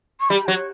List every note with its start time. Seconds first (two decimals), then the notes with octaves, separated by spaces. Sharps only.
0.20 C#6
0.29 G3 B5
0.47 F#3 C#5